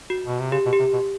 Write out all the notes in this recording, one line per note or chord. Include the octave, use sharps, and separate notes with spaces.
F#4
B2
C3
C#3 G4
B2
G4
C3
B2